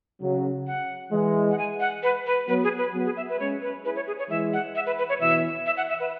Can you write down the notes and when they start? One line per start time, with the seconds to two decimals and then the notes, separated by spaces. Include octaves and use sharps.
0.21 C#3 F#3
0.67 F#5
1.12 E3 G#3
1.51 F#5
1.58 G#5
1.80 F#5
2.03 B4
2.26 B4
2.48 F#3 B3 B4
2.64 G#4
2.78 B4
2.93 F#3 B3
3.05 G#4
3.17 E5
3.29 B4
3.40 G#3 C#4 C#5
3.62 B4
3.84 E4 G#4 B4
3.96 C#5
4.07 G#4
4.19 C#5
4.29 E3 G#3 E5
4.53 F#5
4.75 E5
4.86 B4
4.98 B4
5.09 C#5
5.20 B2 E3 E5
5.66 E5
5.77 F#5
5.89 E5
6.00 B4